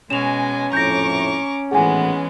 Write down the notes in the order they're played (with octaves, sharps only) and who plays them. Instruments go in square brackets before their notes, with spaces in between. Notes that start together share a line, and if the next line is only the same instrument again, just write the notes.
[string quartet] B2 G#3 G#5 [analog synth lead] C#4 [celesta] E7 F7
[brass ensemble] A#1 F2 A2 [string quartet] A#5 C#6 D6 [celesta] G6 A#6
[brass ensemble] G#1 A2 F#5 [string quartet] E3 G#3 B3 [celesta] G#4 G#5